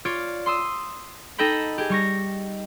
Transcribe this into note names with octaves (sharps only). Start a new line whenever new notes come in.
F4 C#5 D5
C6 D#6 E6
D#4 A4 D#5 G5 B5
G4 G#4
G3 C#6 A#6